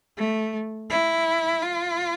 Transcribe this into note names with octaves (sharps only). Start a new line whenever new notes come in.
A3
E4
F4